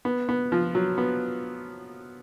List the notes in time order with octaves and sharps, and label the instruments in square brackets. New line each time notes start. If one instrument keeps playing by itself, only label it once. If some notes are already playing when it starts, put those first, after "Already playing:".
[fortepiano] B3
B3
F3
F#3
B3